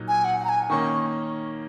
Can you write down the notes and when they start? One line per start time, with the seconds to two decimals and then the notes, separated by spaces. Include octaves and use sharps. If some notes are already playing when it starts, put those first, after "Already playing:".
Already playing: A#2 F#3 D#4
0.08 G#5
0.24 F#5
0.40 F#5
0.45 A#5
0.49 G#5
0.70 D#3 A#3 C#4 C#6